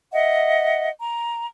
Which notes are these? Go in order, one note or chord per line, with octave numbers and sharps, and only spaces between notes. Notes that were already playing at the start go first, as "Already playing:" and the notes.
D#5 E5 F#5
A#5